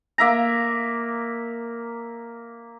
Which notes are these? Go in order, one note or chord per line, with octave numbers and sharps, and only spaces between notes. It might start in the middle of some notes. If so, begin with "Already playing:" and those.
A#3 E5 A#5